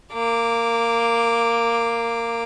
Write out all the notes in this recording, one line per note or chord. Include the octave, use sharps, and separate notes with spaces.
A#3 D6